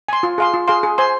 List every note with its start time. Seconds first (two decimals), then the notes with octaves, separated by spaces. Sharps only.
0.08 G#5 C6
0.23 F4
0.38 G#4 F5 C6
0.54 F4
0.68 G#4 F5 C6
0.83 G#4
0.98 C5 G#5 C6